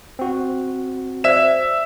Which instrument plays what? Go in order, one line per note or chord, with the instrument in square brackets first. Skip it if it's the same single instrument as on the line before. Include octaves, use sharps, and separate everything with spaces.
[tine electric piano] C4 F#4
[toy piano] C5 D5 F5 [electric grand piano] E5 E7